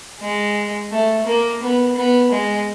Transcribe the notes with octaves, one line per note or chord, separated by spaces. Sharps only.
G#3
A3
A#3
B3
B3
G#3